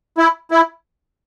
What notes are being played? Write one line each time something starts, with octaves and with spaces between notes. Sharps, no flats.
E4
E4